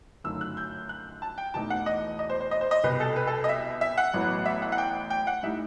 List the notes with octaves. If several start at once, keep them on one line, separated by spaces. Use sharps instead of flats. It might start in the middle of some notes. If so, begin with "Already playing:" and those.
G1 F#2 D#3 F#3 A3 E6
F#6
G6
F#6
A5
G5
E1 E2 B2 A3 D#4 A5
F#5
D#5
D#5
C5
C5
D#5
C5
D#5
C2 B2 G3 B4
A4
B4
A4
D#5
E5
E5
F#5
A1 A2 F#3 B3
E5
F#5
F#5
G5
G5
F#5
A2 G3 D#4 E5